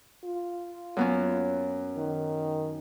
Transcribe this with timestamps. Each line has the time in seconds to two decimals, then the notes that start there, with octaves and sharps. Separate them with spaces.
0.24 F4
0.97 F#2 B3 C#4
1.97 D#3